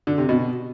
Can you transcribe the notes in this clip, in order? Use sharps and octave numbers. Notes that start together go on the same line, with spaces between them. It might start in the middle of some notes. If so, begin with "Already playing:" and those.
D3
C3
B2